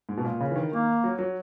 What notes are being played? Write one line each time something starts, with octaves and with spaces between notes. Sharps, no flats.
G#2
B2
A#2
C#3
E3
D#3
D#3 A#3
F#3
F#3